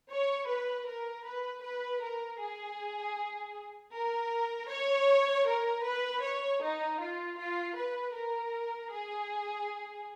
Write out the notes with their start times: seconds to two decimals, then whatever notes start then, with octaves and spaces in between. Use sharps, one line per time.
0.10 C#5
0.48 B4
0.87 A#4
1.25 B4
1.63 B4
2.01 A#4
2.40 G#4
3.93 A#4
4.69 C#5
5.47 A#4
5.84 B4
6.23 C#5
6.62 D#4
7.00 F4
7.38 F4
7.77 B4
8.14 A#4
8.91 G#4